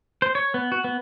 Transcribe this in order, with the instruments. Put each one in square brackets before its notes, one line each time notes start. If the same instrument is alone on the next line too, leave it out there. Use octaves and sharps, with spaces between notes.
[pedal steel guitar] C5
C#5
B3
F#4
B3